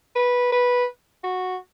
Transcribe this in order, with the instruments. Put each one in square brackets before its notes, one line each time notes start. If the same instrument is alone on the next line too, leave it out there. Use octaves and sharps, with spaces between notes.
[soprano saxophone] B4
B4
F#4